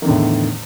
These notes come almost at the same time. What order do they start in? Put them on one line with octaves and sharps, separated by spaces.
D#3 E2 D3 A2